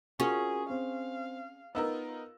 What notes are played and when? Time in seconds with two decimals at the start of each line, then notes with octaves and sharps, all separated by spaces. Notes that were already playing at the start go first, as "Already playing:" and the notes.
0.20 C#4 F4 F#4 G#4 A#4
0.70 C4 F5
1.75 B3 D#4 F4 A#4 E6